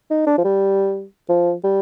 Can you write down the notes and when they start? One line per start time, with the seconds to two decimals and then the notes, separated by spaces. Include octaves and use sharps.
0.10 D#4
0.27 D4
0.38 F3
0.44 G3
1.29 F3
1.64 G3